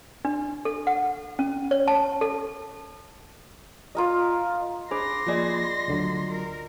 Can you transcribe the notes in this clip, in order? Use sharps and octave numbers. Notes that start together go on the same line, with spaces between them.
D4
A4
F#5
C#4
C#5
A5
A4
F4 A#4 D#5
D4 G#4 C5 B5 C6 D6 A#6
F3 A#3 F4 G#4 D5 D#5
D2 D3 F#3
A#4